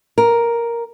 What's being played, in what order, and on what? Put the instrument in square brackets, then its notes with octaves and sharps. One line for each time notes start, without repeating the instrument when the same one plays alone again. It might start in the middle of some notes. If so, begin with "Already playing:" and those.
[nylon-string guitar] A#4